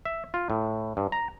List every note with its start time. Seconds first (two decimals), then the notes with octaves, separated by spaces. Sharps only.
0.05 E5
0.34 F4
0.50 A2
0.97 G2
1.12 A#5